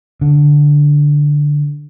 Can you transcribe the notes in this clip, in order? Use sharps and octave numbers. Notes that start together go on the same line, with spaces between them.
D3